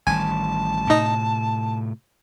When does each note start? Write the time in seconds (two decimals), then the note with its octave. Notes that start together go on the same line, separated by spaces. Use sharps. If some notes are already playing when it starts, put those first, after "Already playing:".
0.07 A1 D#3 G3 G#5 A5
0.90 A2 C3 D#4 D#5